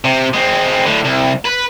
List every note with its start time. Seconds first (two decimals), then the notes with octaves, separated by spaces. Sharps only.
0.05 C3
0.34 G#3 C4
0.86 A2 D3
1.05 C2
1.46 B4